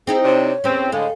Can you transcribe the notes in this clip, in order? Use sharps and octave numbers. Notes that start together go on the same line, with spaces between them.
C4 D#4 E4 G#4
C3 D4 C#5
E2 C4 C#4 G4
A2 D3 G#3 A4 F5